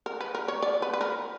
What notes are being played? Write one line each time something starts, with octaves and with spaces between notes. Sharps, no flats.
A#4
B4
A#4
C#5
D5
B4
B4
A#4